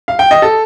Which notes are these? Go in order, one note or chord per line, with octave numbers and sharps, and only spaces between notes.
F5
G5
D#5
A4